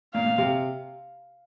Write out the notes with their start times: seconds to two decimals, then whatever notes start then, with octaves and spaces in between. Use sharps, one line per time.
0.14 A#2 F5
0.26 A#2
0.38 C3